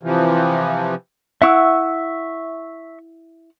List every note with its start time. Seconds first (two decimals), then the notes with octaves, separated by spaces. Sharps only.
0.03 C3 E3 F3
1.42 E4 E5 F#5 C#6 E6